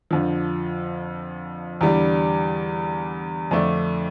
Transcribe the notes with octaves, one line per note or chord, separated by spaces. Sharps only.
F2 D3 F3
E2 D3 G3 D4
F2 D3 A3 D4